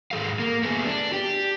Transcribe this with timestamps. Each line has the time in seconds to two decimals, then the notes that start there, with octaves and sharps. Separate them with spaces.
0.11 G#2 G#4 A4 F5
0.39 A#3
0.63 A3 B3 G#4
0.86 D4
1.13 G4